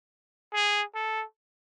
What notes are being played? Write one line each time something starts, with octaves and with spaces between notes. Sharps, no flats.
G#4
A4